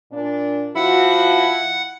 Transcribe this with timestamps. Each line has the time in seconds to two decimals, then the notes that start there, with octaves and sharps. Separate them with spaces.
0.12 A#2 D4
0.76 F3 E4 F#4 F#5